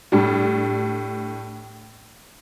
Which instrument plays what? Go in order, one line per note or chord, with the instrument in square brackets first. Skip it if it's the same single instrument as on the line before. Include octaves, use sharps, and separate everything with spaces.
[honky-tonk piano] A2 G3 D4